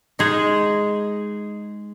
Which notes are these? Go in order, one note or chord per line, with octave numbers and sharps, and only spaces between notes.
G#3 D#4 G#4